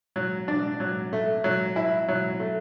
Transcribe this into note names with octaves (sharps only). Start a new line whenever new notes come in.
F#3
D4
F#3
A3
F#3
E4
F#3
A3